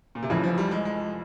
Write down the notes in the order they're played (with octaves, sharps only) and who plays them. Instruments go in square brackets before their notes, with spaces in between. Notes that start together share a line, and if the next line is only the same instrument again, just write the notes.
[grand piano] A#2
C3
[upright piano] F1 F2 E3 [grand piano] C#3
[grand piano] F3
G3
G#3
G#3